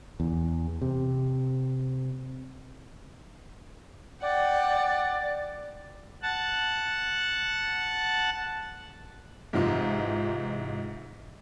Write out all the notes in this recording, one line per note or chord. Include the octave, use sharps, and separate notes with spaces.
E2
C3
D5 F#5 G5
F#5 A5
G#2 C3 E3 D#4 F4